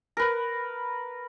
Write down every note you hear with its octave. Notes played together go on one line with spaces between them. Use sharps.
A#4 B4